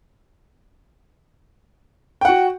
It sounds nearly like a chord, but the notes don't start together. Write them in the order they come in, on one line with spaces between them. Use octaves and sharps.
G5 F#5 F#4